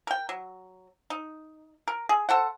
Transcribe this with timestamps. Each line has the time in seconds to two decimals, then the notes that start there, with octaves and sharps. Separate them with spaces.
0.07 A#4 G5
0.29 F#3
1.10 D#4
1.88 A#4
2.09 G#4
2.29 A4 C5 F#5